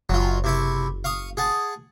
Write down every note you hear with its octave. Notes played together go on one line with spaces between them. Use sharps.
F#1 F#3 F4
C3 E4 C#6
F5 C#6 D#6
G#4 F#5 A5